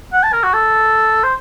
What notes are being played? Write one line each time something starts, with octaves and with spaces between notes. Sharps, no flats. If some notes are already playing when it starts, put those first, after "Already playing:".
F#5
A5
A#4
F#4
A4
C5